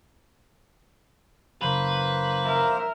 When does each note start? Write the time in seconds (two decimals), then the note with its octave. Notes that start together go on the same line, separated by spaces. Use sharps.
1.62 F#1 A#3 B4 C5
2.44 A#4 E5